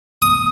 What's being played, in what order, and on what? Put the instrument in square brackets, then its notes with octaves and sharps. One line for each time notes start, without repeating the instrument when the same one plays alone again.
[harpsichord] D#6